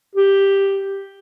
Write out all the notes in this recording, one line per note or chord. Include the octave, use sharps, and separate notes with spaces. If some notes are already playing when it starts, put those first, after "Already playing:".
G4